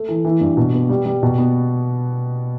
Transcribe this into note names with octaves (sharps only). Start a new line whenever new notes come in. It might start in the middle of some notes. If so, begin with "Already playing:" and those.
Already playing: A3
E3
E3
G2
B2
B3
G3
G3
B2
B3